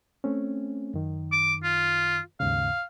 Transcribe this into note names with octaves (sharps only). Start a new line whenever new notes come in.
A3 C4 C#4
F#2 D#3
D6
F4
D#2 G#2 C#3 F5